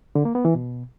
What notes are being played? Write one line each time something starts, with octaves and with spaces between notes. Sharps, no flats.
D3
A#3
B3
E3
B2